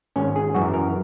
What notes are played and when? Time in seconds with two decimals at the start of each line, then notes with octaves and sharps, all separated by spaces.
0.16 G#1 C#4
0.36 G#4
0.55 F#2 E3 F#4
0.74 A#4